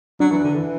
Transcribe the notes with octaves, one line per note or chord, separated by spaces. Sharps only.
F#3 D4
E3
D3
E3